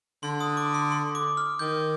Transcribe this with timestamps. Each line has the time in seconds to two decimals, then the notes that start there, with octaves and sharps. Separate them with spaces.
0.23 D3 C6
0.41 D#6
0.57 D6
0.74 C6
0.92 C6
1.15 D6
1.37 F6
1.59 D#3 G6